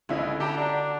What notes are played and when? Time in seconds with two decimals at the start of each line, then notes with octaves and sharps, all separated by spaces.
0.09 C#2 D3 E4 D#5
0.40 F#4 G4 A5 A#5
0.58 D4